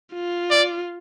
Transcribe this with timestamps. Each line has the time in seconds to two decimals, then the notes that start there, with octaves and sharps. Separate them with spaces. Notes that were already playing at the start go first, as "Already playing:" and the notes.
0.13 F4
0.51 D5